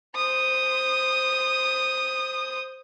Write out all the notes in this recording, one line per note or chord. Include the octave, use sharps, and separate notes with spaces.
C5 D#6